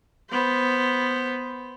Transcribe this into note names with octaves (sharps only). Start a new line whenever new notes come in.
B3 C5